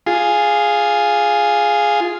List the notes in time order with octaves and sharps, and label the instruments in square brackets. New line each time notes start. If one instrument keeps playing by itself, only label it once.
[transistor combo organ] F4 G#4